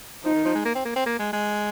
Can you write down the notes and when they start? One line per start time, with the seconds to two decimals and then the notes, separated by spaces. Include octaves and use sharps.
0.24 F3 D#4
0.35 D#3
0.45 F3
0.55 G#3
0.65 A#3
0.76 C4
0.86 A#3
0.96 C4
1.06 A#3
1.19 G#3
1.33 G#3